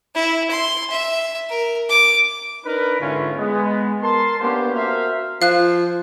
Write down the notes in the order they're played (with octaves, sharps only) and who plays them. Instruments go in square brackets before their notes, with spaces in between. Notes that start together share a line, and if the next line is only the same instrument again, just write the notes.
[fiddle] E4
C6
E5
A#4
D6
[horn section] D4 D#4 A#4 B4
G#2 D3 C#4 E4 F4
G#3 B3
A#4 A5 C6
A#3 B3 C#4 D4 G4 C5
F#4 A#4 C5 E5 F5
[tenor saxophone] F3 [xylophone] F5 F#6